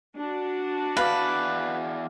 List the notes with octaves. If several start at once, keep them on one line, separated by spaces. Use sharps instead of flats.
D4 F#4
E2 B4 D5 F5